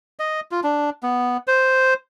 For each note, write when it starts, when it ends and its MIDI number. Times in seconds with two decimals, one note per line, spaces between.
0.19 0.40 75
0.52 0.60 65
0.64 0.90 62
1.03 1.37 59
1.47 1.94 72